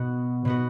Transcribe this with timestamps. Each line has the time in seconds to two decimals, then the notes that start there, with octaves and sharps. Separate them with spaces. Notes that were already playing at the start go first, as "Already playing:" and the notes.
Already playing: B2 B3 F#4
0.45 B2 B3 F#4